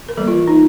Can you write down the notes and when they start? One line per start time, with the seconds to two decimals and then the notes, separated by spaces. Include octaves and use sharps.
0.09 A#4
0.17 E3 G3 A#3 A4
0.28 F4
0.47 D#4